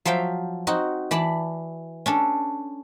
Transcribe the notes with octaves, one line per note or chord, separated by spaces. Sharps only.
F3 F#3 E5 F5 G5
C4 D#4 F#4
E3 D5 A5 B5
C#4 D4 A4